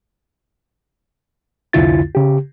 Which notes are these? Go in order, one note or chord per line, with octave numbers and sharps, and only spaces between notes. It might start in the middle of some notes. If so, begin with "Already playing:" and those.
C2 F2 D3 E4 F4 A6
C#3 G4